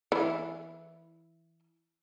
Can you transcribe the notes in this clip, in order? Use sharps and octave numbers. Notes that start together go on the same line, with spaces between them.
E3 E4